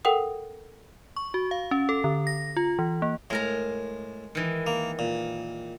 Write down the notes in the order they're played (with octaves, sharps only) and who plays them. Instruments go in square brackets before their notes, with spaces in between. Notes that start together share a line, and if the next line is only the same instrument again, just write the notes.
[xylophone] A4 A#4 F#5 G5 D#6
[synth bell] C#6
F#4
F5
C#4
A4
D3
A#6
F4
E3
A#3
[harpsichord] A2 [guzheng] G#3 A#4 A#5
[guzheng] D#3 E3
[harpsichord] A#3
A#2